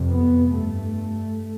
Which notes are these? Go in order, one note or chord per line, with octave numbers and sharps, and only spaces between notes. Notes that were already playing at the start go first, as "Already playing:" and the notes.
Already playing: F2 C3
B3
G2 A3